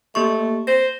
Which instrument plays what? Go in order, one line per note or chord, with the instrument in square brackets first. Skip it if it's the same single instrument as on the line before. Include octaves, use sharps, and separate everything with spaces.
[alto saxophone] A3 [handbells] A#3 G4 C#6
[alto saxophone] C5 [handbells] A#6